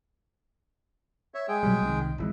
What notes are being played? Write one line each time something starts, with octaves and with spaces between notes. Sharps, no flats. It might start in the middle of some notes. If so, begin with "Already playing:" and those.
C#5 E5
G#3 G#4 G5
B2 F#3 G3
C2 D#3
G#1 E3 G#3